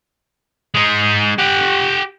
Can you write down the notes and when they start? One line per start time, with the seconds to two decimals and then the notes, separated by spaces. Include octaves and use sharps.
0.75 G#3 D#4
1.38 G4 F#5